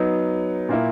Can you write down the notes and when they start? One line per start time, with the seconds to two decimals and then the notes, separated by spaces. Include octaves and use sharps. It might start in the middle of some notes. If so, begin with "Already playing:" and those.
Already playing: F#3 B3 D#4
0.69 A#2 A#3 E4